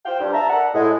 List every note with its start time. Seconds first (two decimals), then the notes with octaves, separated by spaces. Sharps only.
0.06 F4 C5 F5 G5
0.20 G2
0.33 E5 A5 A#5
0.50 A4 A#4 D5 F#5
0.74 A2 G#3